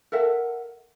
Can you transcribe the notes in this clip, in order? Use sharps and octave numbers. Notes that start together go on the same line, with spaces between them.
A4 A#4 E5 F#5